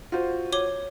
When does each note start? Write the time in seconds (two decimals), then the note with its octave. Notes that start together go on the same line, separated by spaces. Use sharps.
0.12 F4 F#4 C5
0.53 C#5 D6 G7